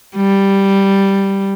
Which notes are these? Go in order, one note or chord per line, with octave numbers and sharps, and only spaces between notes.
G3